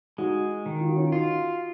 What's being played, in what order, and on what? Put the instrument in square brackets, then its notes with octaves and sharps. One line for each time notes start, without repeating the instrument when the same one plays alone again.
[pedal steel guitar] G#3 [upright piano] D#4 F#4
[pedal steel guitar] D#3
[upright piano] F4
F#4
C#4 F4
[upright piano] D#4 F#4 [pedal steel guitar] F4